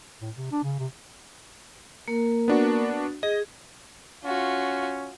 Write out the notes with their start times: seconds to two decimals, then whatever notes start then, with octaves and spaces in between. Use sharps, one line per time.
0.21 A2
0.36 C3
0.51 D4
0.64 C#3
0.79 C3
2.08 A#3 A#4
2.48 B3 D4 F#4
3.23 G#4 D#5
4.25 C#4 F4 F#4